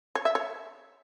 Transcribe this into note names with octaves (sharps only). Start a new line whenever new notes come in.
C#5
E5
C#5